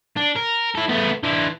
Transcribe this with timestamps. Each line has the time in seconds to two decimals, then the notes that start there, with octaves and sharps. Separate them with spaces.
0.17 D4
0.36 A#4
0.75 E4 A4
0.89 A3 B3
1.23 E3 D4